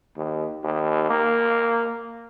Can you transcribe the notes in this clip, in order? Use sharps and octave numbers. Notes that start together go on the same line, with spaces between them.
D#2
D#2
A#3